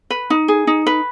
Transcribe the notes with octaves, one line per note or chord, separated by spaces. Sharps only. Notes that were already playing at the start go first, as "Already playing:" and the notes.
B4
D#4
G#4
D#4
B4